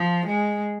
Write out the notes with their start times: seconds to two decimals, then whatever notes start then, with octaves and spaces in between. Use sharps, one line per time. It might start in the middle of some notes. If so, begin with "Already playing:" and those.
Already playing: F3
0.26 G#3